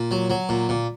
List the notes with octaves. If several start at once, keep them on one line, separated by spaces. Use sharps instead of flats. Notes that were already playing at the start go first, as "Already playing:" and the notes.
Already playing: A#2
F#3
F#3
A#2
A#2